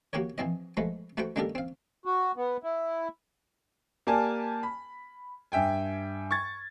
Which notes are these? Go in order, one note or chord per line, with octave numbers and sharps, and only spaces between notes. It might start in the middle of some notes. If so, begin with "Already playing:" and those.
A#3 F#4 G4 A#4 C#5
E3 F3 C4 D#5
F3 G#3 A3 B4
A3 F#4 B4 C5 G5
G#3 A#3 D4 G4 A4 A#4
C4 F5
F#4
B3
E4
A#3 G4 A#4 D5 G#5 A5
B5
G2 E5 G5 G#5
C#6 G#6 A6